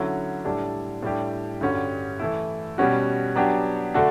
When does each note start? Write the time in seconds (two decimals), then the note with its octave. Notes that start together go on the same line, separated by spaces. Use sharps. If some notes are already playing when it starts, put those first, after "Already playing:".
Already playing: D3 F#3 C#4 E4
0.45 A2 G3 D4 A4
1.03 A2 G3 D4 G4
1.61 G2 D3 G3 C#4 F#4
2.19 E3 A3 E4
2.78 B2 G3 C#4 F#4
3.36 F#3 B3 D4 G4
3.94 D3 A3 D4 F#4 A4